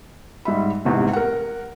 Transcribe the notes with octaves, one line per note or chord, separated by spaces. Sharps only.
G#2 G3 E5 B5
F1 E2 G#2 C3
A#4 F#5